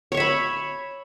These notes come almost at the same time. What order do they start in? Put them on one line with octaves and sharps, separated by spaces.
C#5 C#6 E5 B5